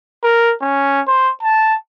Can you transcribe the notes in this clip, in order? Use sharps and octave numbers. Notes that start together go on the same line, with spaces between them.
A#4
C#4
C5
A5